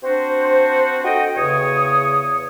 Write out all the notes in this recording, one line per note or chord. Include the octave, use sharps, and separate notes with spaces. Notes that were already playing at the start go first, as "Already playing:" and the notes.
C4 D4 F#4 C5
F#4 A4 D#5 G5
E2 C#3 C#5 D#6